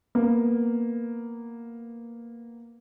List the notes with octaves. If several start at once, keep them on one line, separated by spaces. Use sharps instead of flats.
A#3 B3